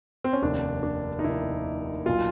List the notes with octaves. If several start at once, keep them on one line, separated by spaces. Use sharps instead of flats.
C4
C#4
F1 D#2 D#3 D4
D4
D#4
F1 D#2 D#3 E4
B1 A#2 F4